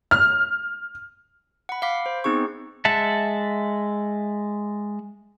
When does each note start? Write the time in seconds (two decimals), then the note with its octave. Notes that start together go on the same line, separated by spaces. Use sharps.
0.11 F6
1.69 F#5 B5
1.82 F5 B5 D6 B6
2.06 C5
2.24 B3 C4 D#4 G#4 C#6
2.85 G#3 E5 F#5 A5